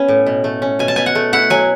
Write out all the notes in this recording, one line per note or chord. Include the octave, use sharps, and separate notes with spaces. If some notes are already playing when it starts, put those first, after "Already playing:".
Already playing: B3 C#4 G#5
A2
B2
A3
C#4
B2 G#5
A5
B2 G#5
F#5
A3
E4 F#5
F#3 G#5